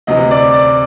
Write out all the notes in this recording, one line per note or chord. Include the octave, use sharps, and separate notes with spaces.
D2 C3 E3 D#5
D5
D5